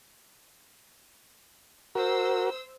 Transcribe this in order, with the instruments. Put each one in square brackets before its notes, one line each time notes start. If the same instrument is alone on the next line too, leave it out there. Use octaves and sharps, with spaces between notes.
[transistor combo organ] F#4 A#4 [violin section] C5 E6